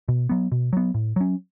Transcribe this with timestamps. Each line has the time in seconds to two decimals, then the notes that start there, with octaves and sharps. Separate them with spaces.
0.08 B2
0.29 F#3 B3
0.52 B2
0.73 F#3 B3
0.94 A2
1.16 F#3 C#4